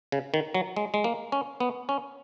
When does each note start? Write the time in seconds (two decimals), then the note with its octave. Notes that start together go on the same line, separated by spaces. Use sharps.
0.12 C#3
0.34 D#3
0.54 F#3
0.76 G#3
0.94 G#3
1.04 A#3
1.32 C#4
1.60 B3
1.89 C#4